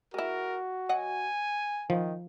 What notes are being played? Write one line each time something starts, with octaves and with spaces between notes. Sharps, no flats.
G#3 E4 F#4 A#4
F#3 D#5 F#5 G#5
D#3 F3